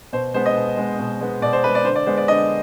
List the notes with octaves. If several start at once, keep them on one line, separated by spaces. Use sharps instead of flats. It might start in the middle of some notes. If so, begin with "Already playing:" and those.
B2 C5
G#3 B3 C5
D#5
B2
G#3 B3
B2
G#3 B3
B2 D5
C5
G#3 B3 B4
D5
D3 C5
D5
G#3 B3 C5
D5
D3 D#5